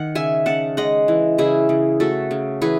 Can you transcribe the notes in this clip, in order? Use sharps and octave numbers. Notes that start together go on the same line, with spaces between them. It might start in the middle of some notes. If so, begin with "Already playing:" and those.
Already playing: D#3 F#5
C#3 E5 G#5
C#3 F#5 A5
G#3 D#5 F#5
E3
C#3 E4 G#4
C#3
A3 F#4 A4
C#3
E3 G#4 B4